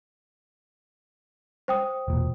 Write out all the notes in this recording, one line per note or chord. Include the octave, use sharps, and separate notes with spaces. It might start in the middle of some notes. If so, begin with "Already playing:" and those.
C5 G5 D#6
E1 A#2